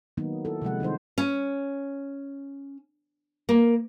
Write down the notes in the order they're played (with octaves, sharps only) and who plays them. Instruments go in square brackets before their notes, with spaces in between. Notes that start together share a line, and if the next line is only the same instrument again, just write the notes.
[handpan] D#3 F#3 A#3 B3 D#4
E4 A4
C3 F3 G#3 F#5
D#3 G3 D#4 C5
[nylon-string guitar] C#4
A#3